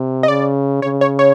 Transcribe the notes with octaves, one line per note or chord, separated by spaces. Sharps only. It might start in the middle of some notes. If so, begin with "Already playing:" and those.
Already playing: C3
D#5
C#3 D5
C#3 C#5
C#5
C#5